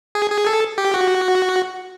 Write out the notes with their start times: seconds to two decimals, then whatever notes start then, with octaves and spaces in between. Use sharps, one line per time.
0.15 G#4
0.31 G#4
0.46 A4
0.78 G4
0.94 F#4